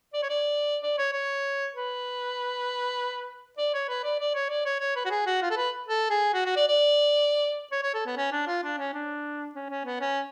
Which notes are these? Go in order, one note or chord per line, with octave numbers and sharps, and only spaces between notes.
D5
C#5
D5
D5
C#5
C#5
B4
D5
C#5
B4
D5
D5
C#5
D5
C#5
C#5
B4
F#4
G#4
F#4
F4
A4
B4
A4
G#4
F#4
F#4
D5
D5
C#5
C#5
A4
B3
C#4
D4
F4
D4
C#4
D4
C#4
C#4
B3
C#4